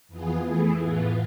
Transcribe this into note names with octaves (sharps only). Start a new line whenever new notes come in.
F2 E3 B3 F4 G#4
E3 A3 E4 G#4
A2 E3 B3 F4